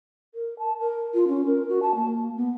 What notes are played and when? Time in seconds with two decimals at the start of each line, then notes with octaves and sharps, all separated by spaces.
0.35 A#4
0.59 A5
0.79 A#4
1.14 F4
1.28 C#4
1.46 A#4
1.69 F#4
1.82 A5
1.95 A#3
2.37 B3